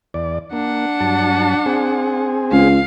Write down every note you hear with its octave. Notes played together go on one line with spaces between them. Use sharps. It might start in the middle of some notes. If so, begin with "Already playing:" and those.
E2 D5
A#3 D4 F#5
G2 F#3 A5
C4 G#4
C#2 F5